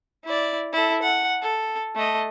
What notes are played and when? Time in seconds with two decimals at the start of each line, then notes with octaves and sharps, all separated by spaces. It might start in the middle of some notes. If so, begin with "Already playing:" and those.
0.25 E4 D5
0.73 E4 A4
1.02 F#5
1.42 A4
1.95 A3 D#5